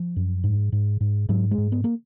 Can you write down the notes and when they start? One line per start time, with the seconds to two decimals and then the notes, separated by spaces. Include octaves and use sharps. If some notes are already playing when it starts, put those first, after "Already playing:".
Already playing: F3
0.16 F#2
0.44 G#2
0.72 G#2
1.00 G#2
1.29 G#2 F#3
1.51 G#3
1.58 G#2
1.72 B3
1.84 A#3